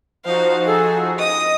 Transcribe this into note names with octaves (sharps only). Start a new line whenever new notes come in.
F3 D#4 F#4 C5 F5
G#4 A4
D#5 D#6